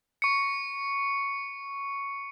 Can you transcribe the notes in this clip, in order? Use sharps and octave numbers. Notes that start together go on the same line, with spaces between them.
C#6 C#7